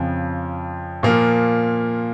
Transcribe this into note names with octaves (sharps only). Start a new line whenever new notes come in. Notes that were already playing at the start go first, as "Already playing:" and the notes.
Already playing: F2 C#3 F3
A#2 F3 A#3